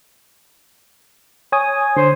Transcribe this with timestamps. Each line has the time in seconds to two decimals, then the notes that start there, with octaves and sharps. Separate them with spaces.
1.52 C#5 G#5 D#6
1.96 D3 C5